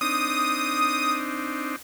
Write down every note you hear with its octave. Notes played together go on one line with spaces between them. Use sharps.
C4 D4 D#4 D#6